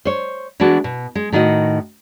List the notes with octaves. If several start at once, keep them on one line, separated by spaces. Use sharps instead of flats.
C5 C#5
E3 G#3 B3 D4 F#4
B2
G#3
A2 D#3 D#4 F#4 D#5